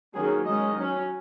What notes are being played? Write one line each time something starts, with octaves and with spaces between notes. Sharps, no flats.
D#3 F#3 A#3 C#4 G#4
D#3 G#3 C#4 D#5
F#3 C#4